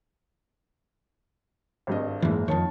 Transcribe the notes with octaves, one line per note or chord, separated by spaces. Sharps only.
G#1 G2 D#5
F#1 G#2 E3
F2 D#3 C#5 A5